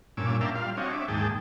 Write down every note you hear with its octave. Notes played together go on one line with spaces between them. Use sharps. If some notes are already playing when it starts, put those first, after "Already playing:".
G2 A#2 C#4 D6 E6
A#4 D5 E5 F5 G5 A5
G3 F4 F5
C4 D4 F#4 C#5 D#5
E5 D6
D#2 G#2 G#4 G5 A5